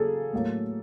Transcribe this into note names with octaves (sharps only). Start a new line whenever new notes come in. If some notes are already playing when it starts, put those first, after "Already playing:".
Already playing: C#3 F#3 A#3 G#4 A4
A2 F#3 A#3